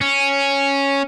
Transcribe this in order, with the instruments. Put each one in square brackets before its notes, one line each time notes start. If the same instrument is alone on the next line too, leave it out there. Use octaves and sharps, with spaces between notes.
[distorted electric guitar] C#4